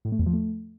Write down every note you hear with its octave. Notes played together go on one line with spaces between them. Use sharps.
A2
A3
E2
F3
A3